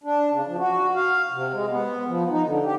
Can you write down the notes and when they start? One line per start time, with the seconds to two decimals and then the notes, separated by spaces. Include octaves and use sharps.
0.04 D4
0.31 C#3
0.47 F3
0.59 F#4
0.95 F5
1.32 C3
1.53 G#3
1.70 B3
2.08 F3
2.30 D#4
2.44 D3
2.64 G4